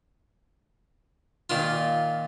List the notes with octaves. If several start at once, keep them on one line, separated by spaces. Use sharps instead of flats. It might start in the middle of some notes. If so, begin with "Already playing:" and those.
A#2 D#3 F4